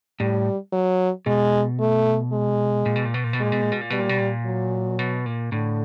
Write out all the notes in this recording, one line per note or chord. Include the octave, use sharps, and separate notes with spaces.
A2 G3
F#3
B2 G#3
A3
G#3
A#2
B2
A#2
B2
A#2
B2
A#2 G#3
B2
A#2
B2
A#2
B2 G3
A#2
B2
A#2
F#3
B2
A#2
A2 D3